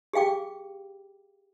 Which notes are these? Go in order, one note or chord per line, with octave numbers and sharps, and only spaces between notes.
G4 G#4 F5 G5 D6